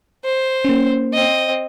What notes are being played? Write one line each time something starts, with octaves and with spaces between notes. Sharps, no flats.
C5
A#3 C#4
C4 D#5